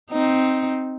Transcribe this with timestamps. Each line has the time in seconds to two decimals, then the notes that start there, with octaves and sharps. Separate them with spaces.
0.11 C4 D#4